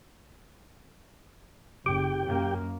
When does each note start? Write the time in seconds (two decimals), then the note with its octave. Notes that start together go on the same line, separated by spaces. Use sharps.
1.86 F#1 G4 G5
2.27 F#2 A#3